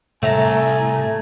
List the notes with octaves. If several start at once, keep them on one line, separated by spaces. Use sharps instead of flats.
C2 A2 A3 E5 G#5 A#5